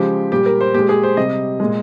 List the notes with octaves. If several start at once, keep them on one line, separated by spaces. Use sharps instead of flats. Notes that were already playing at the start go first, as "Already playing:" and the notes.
Already playing: C#3 F3 G#3 G4
A#2 G3 G4
A#4
C5
A#2 G#3 G4
G#4
C5
C3 G3 D#5
A#2 G#3